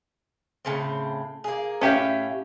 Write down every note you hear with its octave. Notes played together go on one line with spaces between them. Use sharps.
A2 C#3 C4
A#3 G#4
A2 C#4 G4 E5 F5